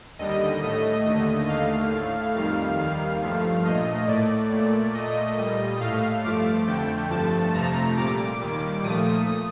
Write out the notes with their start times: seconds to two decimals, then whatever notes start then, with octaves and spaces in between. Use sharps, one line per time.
0.19 D#2 D3 G3 D#5
0.62 A2 A3 D#5
1.05 D#2 D3 A3
1.48 D#2 D3 A3 F5
1.92 A2 A3
2.34 F2 D#3 G3 F5
2.78 D#2 D#3 G3 F5
3.22 G2 F3 A3
3.65 A#2 A3 D#5
4.08 A2 A3 D5
4.52 A#2 A3
4.94 A#2 A3 D#5
5.38 A#2 G3
5.80 A2 A3 F5
6.24 G2 F3 A3 D6
6.67 F2 D3 A3 G5
7.10 G2 F3 A3 A5
7.54 F2 C3 F3 A3 A#5
7.97 A#2 G3 D6
8.40 D#2 D#3 G3
8.83 A#2 F3 A3 D#6